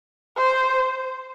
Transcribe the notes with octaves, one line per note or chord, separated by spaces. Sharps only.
C5